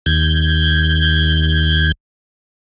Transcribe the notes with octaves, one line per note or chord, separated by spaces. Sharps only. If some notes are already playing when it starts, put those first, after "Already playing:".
D#2 G6 G#6